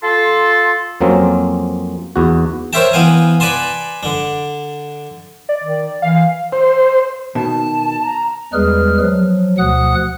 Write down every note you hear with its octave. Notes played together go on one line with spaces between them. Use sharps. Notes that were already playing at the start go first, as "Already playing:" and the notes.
F4 A4 C6
F2 F#3 A#3 C4 C#4
E2 F#4
A#4 C5 C#5 E5 G5 A5
E3 B3 F5 G5 G#5
B4 D5 G#5 A5 C6
D3 D4
D5
D#3
E3 F5
C5
B2 D#3 A5
A#5
E2 G3 G#3 G#4 B4 F6
F3 F#3
D2 B2 F3 F#5 D#6 F#6